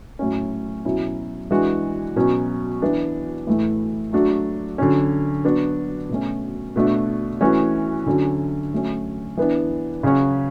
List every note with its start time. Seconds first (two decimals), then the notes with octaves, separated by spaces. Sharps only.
0.19 A2 F#3 C#4
0.85 B2 F#3 C#4 E4
1.51 E3 G#3 D4 F#4
2.16 B2 F#3 C#4
2.82 E3 B3 D4
3.47 A2 E3 A3 E4
4.13 F#3 A3 D4 F#4
4.78 D3 F#3 C#4
5.44 F#3 B3 D4 F#4
6.09 B2 A3 C#4
6.76 B2 A3 D4 F#4
7.41 E3 A3 C#4 F#4
8.06 D3 F#3 C#4
8.72 F#3 A3 C#4
9.37 E3 B3 D4
10.03 C#3 F#3 C#4 F#4